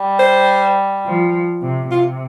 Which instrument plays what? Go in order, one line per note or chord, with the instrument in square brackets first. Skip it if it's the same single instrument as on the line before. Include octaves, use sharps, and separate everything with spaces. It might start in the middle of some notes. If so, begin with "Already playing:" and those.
Already playing: [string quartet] G3
[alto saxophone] C5
[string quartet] F3
C3
[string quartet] C3 [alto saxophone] F4